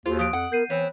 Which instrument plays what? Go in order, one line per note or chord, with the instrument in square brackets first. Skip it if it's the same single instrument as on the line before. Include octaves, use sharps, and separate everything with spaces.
[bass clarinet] D#2 [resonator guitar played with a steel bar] F4 [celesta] F#4 G#4 C5
[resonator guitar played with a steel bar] F3 [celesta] D#6 F#6 D7
[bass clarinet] F2 [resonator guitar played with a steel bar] F#5
[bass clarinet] B3 [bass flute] A#4 [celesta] G6 C7 D#7
[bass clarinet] E3 [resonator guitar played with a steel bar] B3 C4 [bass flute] C#5